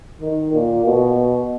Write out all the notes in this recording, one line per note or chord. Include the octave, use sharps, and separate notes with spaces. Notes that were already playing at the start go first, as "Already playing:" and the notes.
D#3
A#2
B2